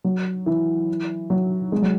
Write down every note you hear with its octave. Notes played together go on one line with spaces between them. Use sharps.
F#3
E3
F#3
G#3
F#3